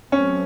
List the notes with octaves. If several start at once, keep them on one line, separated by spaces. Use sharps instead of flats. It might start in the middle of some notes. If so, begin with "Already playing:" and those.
F#3 A3 C4 C#4